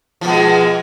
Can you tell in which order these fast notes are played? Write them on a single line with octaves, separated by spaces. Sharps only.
F3 B2 G#3